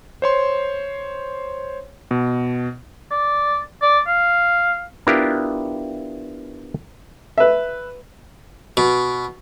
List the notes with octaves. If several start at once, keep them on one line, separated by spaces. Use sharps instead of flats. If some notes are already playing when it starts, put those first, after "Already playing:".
C5 C#5 C6
B2
D5
D5
F5
B3 D4 E4 F4 G4 A#4
B4 E5
B2